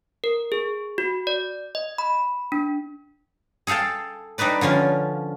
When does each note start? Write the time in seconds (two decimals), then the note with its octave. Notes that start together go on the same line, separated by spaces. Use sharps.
0.24 A#4
0.52 G#4
0.98 F#4
1.27 D5
1.75 D#5
1.98 B5
2.52 D4
3.67 G#4 A4 F5 G5 A5
4.38 G3 D4 D#4 B4 D5
4.61 D3 F3 C#4 F4